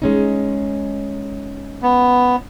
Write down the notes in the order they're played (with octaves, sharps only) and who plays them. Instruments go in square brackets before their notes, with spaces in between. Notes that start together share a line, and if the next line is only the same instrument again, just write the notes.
[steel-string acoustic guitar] G#3 C#4 D#4
[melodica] B3